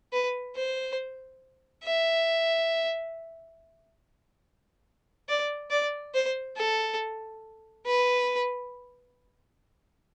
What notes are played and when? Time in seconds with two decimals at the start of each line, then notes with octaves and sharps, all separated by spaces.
0.13 B4
0.55 C5
1.84 E5
5.29 D5
5.70 D5
6.15 C5
6.57 A4
7.86 B4